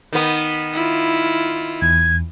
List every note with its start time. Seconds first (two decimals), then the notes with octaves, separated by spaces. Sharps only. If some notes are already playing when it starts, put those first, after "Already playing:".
0.13 D#3 B3
0.73 E4 F4
1.82 E2 G#6